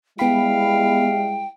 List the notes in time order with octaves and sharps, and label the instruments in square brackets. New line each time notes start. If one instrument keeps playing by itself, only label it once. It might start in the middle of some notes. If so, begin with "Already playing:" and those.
[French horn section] G3 G#3 E4 [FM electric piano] B3 B5 [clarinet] F5 [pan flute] G5